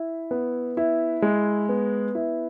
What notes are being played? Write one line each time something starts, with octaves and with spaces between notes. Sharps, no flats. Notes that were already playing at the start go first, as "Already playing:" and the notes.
Already playing: E4
B3
E4
G#3
B3
E4